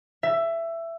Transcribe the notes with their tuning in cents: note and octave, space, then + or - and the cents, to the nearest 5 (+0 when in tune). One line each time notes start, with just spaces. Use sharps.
E5 +15